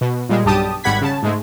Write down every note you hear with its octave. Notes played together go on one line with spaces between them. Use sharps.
B2
A#2 G3 G#3
B1 G2 G3 G4 A5 D#6
G#1 G3 F#5 B5 G#6 B6
C#3 A5
G#2 G#3 A3